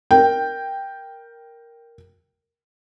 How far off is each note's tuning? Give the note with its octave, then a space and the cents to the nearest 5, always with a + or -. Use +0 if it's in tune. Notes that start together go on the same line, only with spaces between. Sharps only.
A#4 +0 G5 +0